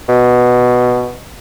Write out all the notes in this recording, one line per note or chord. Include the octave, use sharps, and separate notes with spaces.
B2